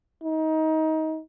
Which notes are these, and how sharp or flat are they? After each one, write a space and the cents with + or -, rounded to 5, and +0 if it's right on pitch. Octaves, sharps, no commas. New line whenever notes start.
D#4 +25